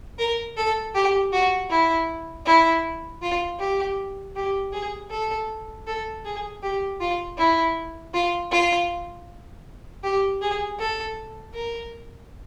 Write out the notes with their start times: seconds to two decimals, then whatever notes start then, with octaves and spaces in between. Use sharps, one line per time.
0.19 A#4
0.57 A4
0.95 G4
1.33 F#4
1.70 E4
2.45 E4
3.22 F4
3.59 G4
4.36 G4
4.72 G#4
5.10 A4
5.87 A4
6.25 G#4
6.63 G4
7.01 F4
7.38 E4
8.14 F4
8.51 F4
10.03 G4
10.41 G#4
10.79 A4
11.54 A#4